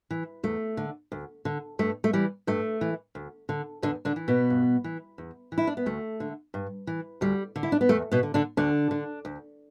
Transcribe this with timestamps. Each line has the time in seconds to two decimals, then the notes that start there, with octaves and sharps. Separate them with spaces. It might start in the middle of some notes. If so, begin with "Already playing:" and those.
0.11 E3
0.43 E2 A3
0.77 D3
1.12 D2
1.45 D3
1.79 G2 A3
2.04 A3
2.13 E3 G3
2.47 G2 A3
2.81 E3
3.15 D2
3.49 D3
3.82 E2 D3 D4
4.05 D3 D4
4.16 E3
4.28 B2 B3
4.50 G2
4.84 E3
5.18 E2
5.52 E3
5.58 E4
5.67 D4
5.77 B3
5.86 D2 A3
6.20 D3
6.54 G2
6.87 E3
7.21 D2 G3
7.56 D3
7.63 E4
7.72 D4
7.81 B3
7.89 E2 A3
8.12 B2 B3
8.23 D3
8.34 D3 D4
8.57 D2 D3 D4
8.91 D3
9.25 D2